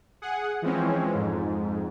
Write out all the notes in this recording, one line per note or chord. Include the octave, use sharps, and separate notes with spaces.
G#4 F#5
E3 F3 G#3 C4 C#4
F2 G#2